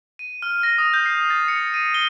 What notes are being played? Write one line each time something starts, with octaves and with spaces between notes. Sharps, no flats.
D#7
F6
A#6
D#6
G6
C7
A6
C#7
D#7
G7